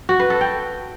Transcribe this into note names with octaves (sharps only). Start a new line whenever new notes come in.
F#4
B4
A4
G5